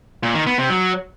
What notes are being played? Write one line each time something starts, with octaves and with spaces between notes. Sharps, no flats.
A#2
D#3
B3
C3
F#3